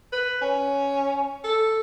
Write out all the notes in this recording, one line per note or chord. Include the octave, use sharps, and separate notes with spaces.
B4
C#4
A4